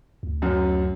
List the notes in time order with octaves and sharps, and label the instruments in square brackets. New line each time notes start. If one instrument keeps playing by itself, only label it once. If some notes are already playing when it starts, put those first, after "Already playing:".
[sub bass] D2
[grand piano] F#2